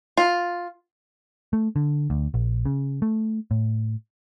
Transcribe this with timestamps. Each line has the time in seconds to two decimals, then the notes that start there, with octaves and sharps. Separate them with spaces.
0.17 F4
1.53 A3
1.76 D3
2.10 D2
2.34 A#1
2.65 C#3
3.02 A3
3.51 A2